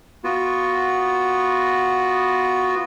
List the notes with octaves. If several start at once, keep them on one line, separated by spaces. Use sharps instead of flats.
B3 F4 F#4